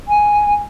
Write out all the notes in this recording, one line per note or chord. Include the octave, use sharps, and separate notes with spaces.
G#5